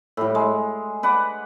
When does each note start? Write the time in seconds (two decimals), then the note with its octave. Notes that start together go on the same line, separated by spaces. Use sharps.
0.17 A2 G3
0.35 G#3
1.03 B4 D5 F#5